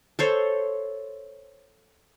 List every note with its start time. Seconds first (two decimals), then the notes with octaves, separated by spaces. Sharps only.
0.19 A4 C5 C#5